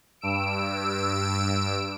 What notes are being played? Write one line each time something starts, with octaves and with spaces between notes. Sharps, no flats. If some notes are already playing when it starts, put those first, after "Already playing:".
G2 E6 D7